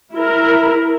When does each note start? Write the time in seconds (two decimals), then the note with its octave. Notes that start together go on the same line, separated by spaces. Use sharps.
0.14 E4 A#4